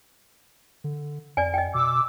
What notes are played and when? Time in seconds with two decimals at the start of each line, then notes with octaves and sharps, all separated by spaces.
0.84 D3
1.37 F2 D5 G#5
1.54 D#5 G5
1.74 B2 D6 E6